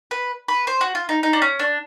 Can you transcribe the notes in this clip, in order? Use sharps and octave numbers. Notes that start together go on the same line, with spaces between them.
B4
B4
C5
F#4
F4
D#4
D#4
D4
C#4
D4